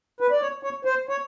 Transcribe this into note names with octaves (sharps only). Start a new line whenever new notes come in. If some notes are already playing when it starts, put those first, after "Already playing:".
B4
D5
C#5
C#5
C5
C#5